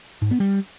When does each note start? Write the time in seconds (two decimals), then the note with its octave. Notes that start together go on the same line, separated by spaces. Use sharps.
0.22 G#2
0.31 B3
0.40 G3